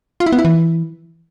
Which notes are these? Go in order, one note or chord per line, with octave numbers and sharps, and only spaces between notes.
F4
E4
B3
E4
E3